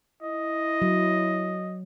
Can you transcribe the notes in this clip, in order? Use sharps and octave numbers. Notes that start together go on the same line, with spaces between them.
E4 D#5
F#3